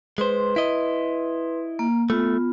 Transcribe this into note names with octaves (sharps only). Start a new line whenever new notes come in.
G#3 B4 C5 C6
E4 D#5
A#3
A3 B3 F4